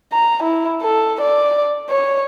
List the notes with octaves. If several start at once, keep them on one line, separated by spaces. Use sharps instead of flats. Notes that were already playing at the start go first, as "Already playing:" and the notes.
A#5
E4
A4
D5
C#5